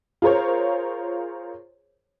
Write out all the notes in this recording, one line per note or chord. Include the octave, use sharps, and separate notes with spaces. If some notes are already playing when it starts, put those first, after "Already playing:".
F4 G#4 A#4 C5 C#5